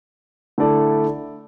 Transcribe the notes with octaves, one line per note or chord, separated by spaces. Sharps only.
D3 A3 E4 A4 D5